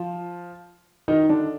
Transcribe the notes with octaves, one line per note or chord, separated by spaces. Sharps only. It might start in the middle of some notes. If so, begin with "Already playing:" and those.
Already playing: F3 F4
D#3 D#4
D3 D4